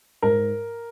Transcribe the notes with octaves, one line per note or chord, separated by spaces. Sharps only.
G#2 A#4